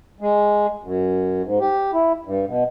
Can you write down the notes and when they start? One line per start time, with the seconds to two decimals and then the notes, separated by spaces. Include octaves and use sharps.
0.21 G#3
0.83 F#2
1.43 G#2
1.60 G4
1.93 E4
2.25 G2
2.46 B2